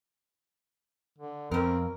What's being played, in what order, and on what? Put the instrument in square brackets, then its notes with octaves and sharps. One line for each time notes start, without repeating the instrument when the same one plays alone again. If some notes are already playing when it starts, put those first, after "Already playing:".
[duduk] D3
[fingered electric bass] F2 [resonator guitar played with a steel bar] B2 A#4 [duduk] C4